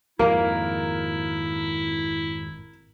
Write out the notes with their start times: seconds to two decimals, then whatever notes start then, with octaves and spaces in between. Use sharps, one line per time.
0.19 G#1 F2 D#3 A#3 E4 A#4